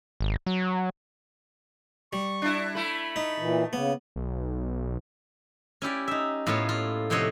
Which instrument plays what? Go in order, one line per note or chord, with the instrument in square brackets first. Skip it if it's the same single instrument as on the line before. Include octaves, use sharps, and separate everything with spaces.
[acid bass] G#1
F#3
[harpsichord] G3 [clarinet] C#6
[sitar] D4 E4
[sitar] A3 E4 [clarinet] B5
[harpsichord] D#4
[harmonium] A#2 E3
[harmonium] C#3 [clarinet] A#3 [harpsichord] B3
[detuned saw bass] B1
[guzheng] C#4 E4 G4 D5
D#4 E5
A2 A#3 B3 F4 C#5
F4
F2 C3 C5 C#5 D#5 F#5